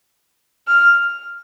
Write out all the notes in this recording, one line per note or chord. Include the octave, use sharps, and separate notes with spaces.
F6